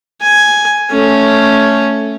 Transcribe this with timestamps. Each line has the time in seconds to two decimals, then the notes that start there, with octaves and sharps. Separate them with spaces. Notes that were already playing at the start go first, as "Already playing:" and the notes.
0.22 G#5
0.91 A3 C#4